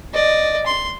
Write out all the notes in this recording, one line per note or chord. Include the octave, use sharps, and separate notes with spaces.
D5 D#5
C6